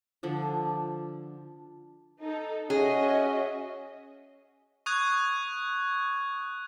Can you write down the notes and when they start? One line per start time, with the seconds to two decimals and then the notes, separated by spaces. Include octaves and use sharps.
0.23 D3 F3 D4
2.21 D#4 A4
2.70 C#4 F#4 G#4 D#5 E5
4.86 C#6 D#6 F#6 G#6